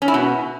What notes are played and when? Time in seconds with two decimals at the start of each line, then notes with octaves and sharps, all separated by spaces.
0.02 C#4
0.08 E4
0.14 B2